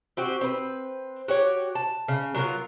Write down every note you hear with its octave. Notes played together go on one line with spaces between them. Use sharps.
C4 F#4 G4
C4 B4
F#4 G4 C#5
A5
C#3
F#3 B3 F4 A#4